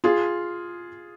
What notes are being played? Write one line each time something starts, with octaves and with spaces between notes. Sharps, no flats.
F4 G#4